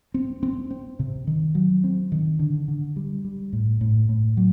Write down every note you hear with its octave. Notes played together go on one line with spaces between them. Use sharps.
C4
C4
C4
C3
D#3
F#3
C4
D#3
D3
D3
G3
G3
A2
A2
A2
F#3